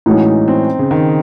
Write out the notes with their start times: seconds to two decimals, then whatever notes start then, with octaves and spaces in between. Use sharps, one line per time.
0.06 A2 E3 G#3 C#4 D#4 F#4
0.48 C4
0.79 C#3
0.91 D#3